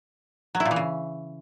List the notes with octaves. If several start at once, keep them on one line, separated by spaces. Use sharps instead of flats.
F#3
E4
A#2
E3
C#3